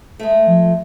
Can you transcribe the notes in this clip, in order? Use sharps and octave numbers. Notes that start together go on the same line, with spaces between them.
G#3 A3
F3